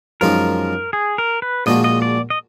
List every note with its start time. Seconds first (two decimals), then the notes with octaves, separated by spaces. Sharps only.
0.21 F#2 F3 G#3 D#4 A#4
0.93 G#4
1.18 A#4
1.42 B4
1.66 A#1 A#2 G#3 D4 F#4 D#5
1.84 D#5
2.02 D5
2.30 D#5